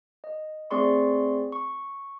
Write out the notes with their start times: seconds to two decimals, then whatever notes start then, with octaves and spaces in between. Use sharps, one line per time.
0.24 D#5
0.71 A3 C4 G#4 D5 C6 C#6
1.52 C#6